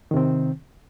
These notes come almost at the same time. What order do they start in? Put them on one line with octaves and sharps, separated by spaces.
D#3 C3 C4